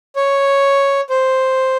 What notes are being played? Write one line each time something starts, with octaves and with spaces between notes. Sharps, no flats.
C#5
C5